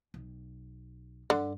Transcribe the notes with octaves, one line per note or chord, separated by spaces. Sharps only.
B1
G2 D3